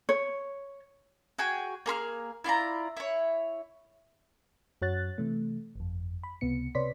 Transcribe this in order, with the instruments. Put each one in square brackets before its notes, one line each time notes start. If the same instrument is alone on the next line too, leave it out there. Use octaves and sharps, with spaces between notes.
[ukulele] C#5
[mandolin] F#4 G#4 G5 G#5
A#3 G#4 B5 F6
E4 F4 D5 A#5
E4 C#5
[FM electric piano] F#2 F#4 C#5 F#6 A6
C3 E3 A3
G1 F2
B5
C#2 C3 B3 C#7
C3 B4 C#5 D5 C6 B6